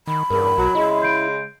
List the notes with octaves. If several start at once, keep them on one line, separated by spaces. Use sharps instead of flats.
D#3 B5
E2 G2 C#3 A#4
B1 F#3
C#3 G#3 E4 D#5
G6 C7 D7